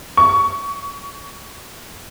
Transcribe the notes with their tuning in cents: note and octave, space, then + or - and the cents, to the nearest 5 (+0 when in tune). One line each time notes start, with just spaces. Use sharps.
C#6 +20